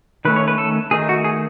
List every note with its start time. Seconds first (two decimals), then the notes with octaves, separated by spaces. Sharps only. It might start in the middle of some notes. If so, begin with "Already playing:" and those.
0.25 D#3 A3 C#4 B4
0.36 C#5
0.48 B4
0.58 A4
0.91 D#3 A3 D#4 G#4
1.09 F#4
1.24 G#4